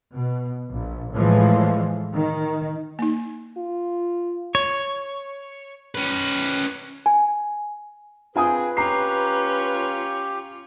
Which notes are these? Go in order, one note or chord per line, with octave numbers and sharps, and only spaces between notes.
B2
A#1
A2 E3 F3 G#3
D#3
A#3 D#4
F4
C#5
C#4 B4
G#5
C4 F4 G#4 B4 G#5 D#6
C#4 F4 G4 C#5 A#5 C7